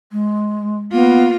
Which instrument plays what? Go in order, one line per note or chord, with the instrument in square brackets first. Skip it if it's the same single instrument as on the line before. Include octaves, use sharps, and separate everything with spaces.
[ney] G#3
[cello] A#3 F4 [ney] B3